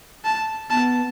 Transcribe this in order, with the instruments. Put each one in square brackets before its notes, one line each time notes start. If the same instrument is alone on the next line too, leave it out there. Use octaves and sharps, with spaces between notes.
[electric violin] A5
[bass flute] B3 [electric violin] A5